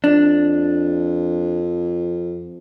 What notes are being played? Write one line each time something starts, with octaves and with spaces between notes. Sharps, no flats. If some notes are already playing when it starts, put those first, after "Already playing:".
F2 D4